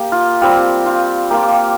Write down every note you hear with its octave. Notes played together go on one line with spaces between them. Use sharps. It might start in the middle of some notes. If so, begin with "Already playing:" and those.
Already playing: A#3 G4
F4
G3 C4 F4 G4
F4
A#3 F4 G4